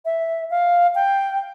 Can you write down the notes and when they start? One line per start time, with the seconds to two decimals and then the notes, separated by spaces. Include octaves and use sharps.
0.05 E5
0.50 F5
0.95 G5